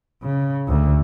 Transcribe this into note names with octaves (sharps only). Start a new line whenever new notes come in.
C#3
D2